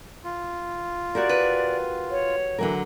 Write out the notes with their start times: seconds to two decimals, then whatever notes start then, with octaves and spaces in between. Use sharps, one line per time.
0.24 F4
1.15 F#4 G4 A#4 D5
1.29 B4
2.10 C#5
2.59 D3 E3 F#3 A#4